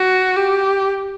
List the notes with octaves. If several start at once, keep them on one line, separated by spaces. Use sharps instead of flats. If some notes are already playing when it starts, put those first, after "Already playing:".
Already playing: F#4
G4